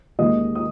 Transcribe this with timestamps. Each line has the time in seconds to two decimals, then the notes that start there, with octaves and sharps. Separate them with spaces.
0.19 D#2 D#3 G#3 D#5 D#6
0.55 D#6